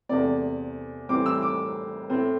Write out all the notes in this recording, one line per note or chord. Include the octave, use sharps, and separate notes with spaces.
E2 C3 A3 C4 D5
A2 E3 G3 C4 D6
E6
D6
A2 A3 C4